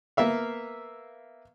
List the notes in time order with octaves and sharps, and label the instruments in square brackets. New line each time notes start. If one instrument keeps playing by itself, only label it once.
[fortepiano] A#3 B3 E5 F5